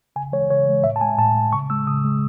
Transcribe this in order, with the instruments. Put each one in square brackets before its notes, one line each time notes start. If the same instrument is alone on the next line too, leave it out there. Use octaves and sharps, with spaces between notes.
[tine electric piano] C#3 G#5
E3 G#3 C#5
C#3 C#5
E3 G#3
A2 E5
A5
G#3 G#5
A2 A5
G#3
C#3 C#6
G#3 E6
C#3 D#6
G#3